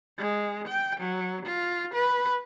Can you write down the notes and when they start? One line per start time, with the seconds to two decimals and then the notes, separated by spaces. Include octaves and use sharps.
0.18 G#3
0.68 G5
1.00 F#3
1.45 F4
1.94 B4